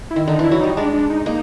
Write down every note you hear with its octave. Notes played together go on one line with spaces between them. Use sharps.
E4
D#3
D3 D#4
E3 E4
F#3
G3 D#4
G#3 D4
D4
D#4
A#3 D#4